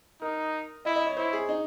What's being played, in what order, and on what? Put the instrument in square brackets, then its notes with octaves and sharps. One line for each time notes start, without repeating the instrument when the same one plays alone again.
[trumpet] D#4 [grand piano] A#4
[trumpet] E4 [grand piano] D#5
[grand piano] D#5
C#5
[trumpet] E4 [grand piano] C5
[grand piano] G#4
D#4